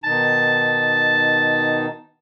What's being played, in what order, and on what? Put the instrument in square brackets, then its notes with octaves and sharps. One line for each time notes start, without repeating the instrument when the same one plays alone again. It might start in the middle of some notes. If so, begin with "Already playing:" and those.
[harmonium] B2 D#3 D#4 [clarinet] A5